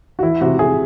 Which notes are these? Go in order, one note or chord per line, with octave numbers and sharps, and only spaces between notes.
F#4
E3 E4
C3 F#4
C3 G#4